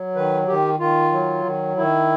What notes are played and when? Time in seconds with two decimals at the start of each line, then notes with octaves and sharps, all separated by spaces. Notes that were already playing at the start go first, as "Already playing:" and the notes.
Already playing: F#3
0.15 D#3 B4
0.47 D#3 G4
0.80 D#3 F4
1.12 F#3
1.45 D#3
1.77 D#3 E4